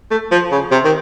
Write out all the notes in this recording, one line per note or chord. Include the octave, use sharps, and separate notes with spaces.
A3
F3
C#3
C3
D#3